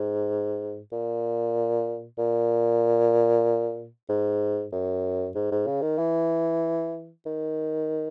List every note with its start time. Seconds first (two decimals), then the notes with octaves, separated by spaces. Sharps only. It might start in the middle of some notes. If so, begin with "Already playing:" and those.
Already playing: G#2
0.92 A#2
2.18 A#2
4.09 G#2
4.72 F#2
5.35 G#2
5.52 G#2
5.67 C#3
5.82 D#3
5.98 E3
7.26 D#3